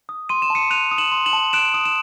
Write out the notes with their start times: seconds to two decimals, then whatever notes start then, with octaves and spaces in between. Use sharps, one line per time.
0.09 D#6
0.29 C6 D#7
0.42 E7
0.50 A5 C#7 D#7
0.71 F#6 D#7 F7
0.91 D#6
0.98 E7 F#7
1.12 C6
1.26 E7 F#7
1.33 A5
1.53 F#6 D7 E7
1.74 D#6
1.85 E7